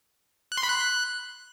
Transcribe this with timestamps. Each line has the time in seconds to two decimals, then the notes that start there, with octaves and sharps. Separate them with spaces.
0.52 F#6
0.57 C6
0.63 B5
0.69 F#6